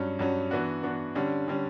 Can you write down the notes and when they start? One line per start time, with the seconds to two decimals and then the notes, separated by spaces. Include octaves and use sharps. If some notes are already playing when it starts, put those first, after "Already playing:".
Already playing: G2 F#3 C#4
0.19 G2 F#3 C#4
0.51 E3 B3 D4 F#4
0.83 E3 B3 D4 F#4
1.15 D3 G3 C#4
1.48 D3 G3 C#4